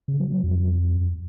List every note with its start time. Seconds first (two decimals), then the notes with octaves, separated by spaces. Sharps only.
0.08 C#3
0.20 F#3
0.32 F#3
0.44 F2